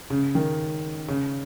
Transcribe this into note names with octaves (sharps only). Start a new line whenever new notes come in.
C#3
D#3
C#3